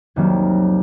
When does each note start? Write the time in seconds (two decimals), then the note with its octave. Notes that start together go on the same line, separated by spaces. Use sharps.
0.16 C2 F2 D#3 F#3 A#3